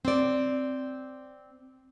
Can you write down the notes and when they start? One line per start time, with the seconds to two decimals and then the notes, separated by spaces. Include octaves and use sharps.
0.05 C4 D5